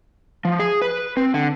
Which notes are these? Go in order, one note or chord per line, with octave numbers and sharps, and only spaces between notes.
F3
G#4
B4
C4
D3